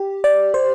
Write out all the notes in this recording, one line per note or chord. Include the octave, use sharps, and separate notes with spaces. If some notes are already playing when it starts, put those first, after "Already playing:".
Already playing: G4
D5
C5